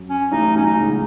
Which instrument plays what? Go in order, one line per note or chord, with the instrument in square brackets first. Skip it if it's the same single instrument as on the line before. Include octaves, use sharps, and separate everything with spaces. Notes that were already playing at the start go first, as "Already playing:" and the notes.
Already playing: [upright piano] F#2
[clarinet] C#4
[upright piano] A1 A2 [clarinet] D#4
[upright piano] B1 B2 [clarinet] C#4
[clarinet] D#4
[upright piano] C#2 C#3